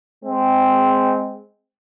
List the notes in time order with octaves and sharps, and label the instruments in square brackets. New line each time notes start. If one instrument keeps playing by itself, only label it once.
[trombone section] G#3 C4